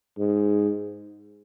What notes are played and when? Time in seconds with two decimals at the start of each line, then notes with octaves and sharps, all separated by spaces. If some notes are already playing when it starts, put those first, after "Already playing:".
0.18 G#2